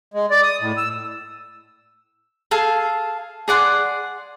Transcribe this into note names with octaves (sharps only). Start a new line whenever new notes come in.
G#3
D5
D#6
A2
E6
G#4 A4 F5 A5
G#4 D5 F#5 C6